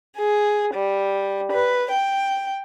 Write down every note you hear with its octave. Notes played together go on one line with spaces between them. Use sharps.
G#4
G3
B4
G5